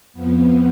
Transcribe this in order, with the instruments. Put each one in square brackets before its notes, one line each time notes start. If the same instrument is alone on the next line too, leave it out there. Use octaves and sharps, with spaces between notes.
[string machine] F2 F3 B3